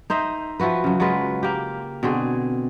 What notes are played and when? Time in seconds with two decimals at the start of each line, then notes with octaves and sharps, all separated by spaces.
0.10 D#4 C5 D#5 E5
0.60 F3 E4 F#4 B4
0.84 C#3 F#3
1.00 F#3 G#3 F4 B4
1.43 A#3 G4
2.03 B2 D3 C4 G#4